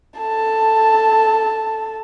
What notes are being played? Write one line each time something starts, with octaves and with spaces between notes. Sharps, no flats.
A4 A5